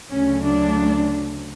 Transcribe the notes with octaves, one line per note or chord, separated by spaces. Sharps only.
D2 C#3 F#3 A3 C#4
D4